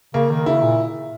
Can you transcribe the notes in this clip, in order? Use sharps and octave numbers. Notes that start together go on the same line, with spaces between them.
C#3 A#3
D#3
C#3 E4
A#2